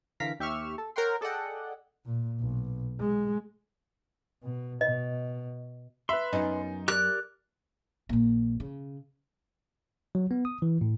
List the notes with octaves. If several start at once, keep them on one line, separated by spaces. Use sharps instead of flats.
D3 E3 A#4 F5 A#5 B6
D#2 G4 E5 C#6 F6 E7
A4
A#4 C#5 F#5 G5 C6
G#4 A4 D5 D#5 F#5 G5
A#2
B1
G#3
B2
B2 D#5
B4 E5 B5 C6
F#2 B3 C#4 D#4
G4 A#4 D5 F#6
A#1 A#2
C#3
F#3
B3
D#6
E3
A2